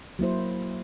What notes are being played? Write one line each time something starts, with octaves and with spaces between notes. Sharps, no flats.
F#3 A#3 E4 C5